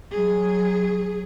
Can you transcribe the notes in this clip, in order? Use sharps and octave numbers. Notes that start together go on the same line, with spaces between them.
F#3 G#4